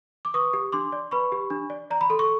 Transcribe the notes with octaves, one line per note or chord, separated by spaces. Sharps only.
D6
B4 C#6 D#6
G4
D4 C6 D6
D5
B4 B5 C#6
G4
D4
D5
D5 A#5
B5
A4 C6
C#6